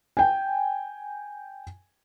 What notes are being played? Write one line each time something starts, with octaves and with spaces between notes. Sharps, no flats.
G5 G#5